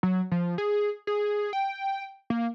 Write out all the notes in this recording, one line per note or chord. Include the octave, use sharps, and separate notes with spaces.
F#3
F3
G#4
G#4
G5
A#3